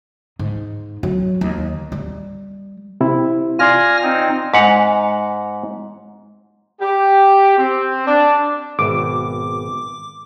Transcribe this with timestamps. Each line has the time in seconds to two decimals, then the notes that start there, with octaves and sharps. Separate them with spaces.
0.39 G#2
1.03 F#3
1.41 D#2
1.92 G3
3.01 C3 C4 E4
3.59 F4 D5 G#5 C6 F6 A#6
4.03 C4 D#4
4.54 G#2 G#3 F#5 A#5
6.81 G4
7.58 C4
8.07 D4
8.79 G#1 B2 E5 D6